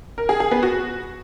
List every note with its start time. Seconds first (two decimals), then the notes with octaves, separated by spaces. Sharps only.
0.18 A#4
0.29 G#4
0.40 G#4
0.51 B3
0.63 F#4